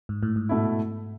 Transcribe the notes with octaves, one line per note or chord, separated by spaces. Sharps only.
G#2
A2
G#2
B2 A3 E4